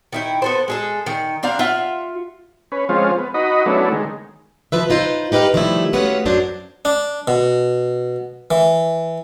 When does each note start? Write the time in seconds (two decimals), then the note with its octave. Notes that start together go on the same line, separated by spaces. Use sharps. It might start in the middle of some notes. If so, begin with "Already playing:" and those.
0.13 D#3 E4 G5
0.42 B3 A4 C5
0.68 G#3 G#4 A4
1.06 D#3
1.43 C4 D4 F5 A#5
1.59 F4 E5 F#5
2.72 C#4 B4
2.89 F3 G#3 C4 C#4 F4
3.18 B3
3.34 D#4 F#4 D#5 B5
3.66 F#3 A3 B3 C#4 D4 E4
3.92 D#3 G#3
4.72 B2 F3 B4 E5
4.90 D#4 F4 B4 C5
5.32 D#4 G4 B4 E5 F5
5.54 D#3 F3 G3 A3 E4
5.93 A3 B3 C#4 F4 F#4 F#5
6.26 F#2 F#3 D4 C5
6.85 D4
7.28 B2
8.51 E3